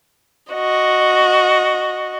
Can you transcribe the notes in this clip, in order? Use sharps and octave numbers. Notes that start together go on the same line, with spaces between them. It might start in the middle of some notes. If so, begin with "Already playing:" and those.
F#4 D#5